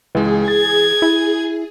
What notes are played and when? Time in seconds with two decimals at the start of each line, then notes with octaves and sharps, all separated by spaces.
0.15 C#2 E3 G#3 G#4
0.48 G#6 A6
1.02 E4